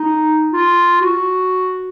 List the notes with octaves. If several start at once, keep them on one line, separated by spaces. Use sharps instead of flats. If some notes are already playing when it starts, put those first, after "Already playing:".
Already playing: D#4
F4
F#4